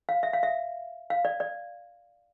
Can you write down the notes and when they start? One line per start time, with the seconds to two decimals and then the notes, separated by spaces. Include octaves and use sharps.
0.09 F5
0.23 E5
0.33 F5
0.43 E5
1.10 F5
1.25 D5
1.40 D5